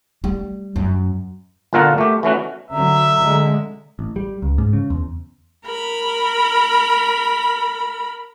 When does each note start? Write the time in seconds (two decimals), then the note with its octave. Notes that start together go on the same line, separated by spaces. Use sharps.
0.24 G3
0.76 F#2
1.73 G1 A#2 F4 A4 A#4 F#5
1.98 A3 G4
2.23 E3 A3 C#4 F#4
2.70 D3 F#3 E5 A#5
3.18 D3 G#3
3.99 A1
4.16 G3
4.42 C#2
4.58 G#2
4.73 C#3
4.90 E2
5.66 A#4 B5